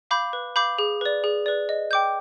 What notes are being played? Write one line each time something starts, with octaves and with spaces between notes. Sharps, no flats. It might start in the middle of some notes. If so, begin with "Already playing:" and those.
F5 B5 D6 G6
B4
F5 B5 D6 G6
G#4
B4 D5
G#4
B4 D5
D#5
G5 D6 G6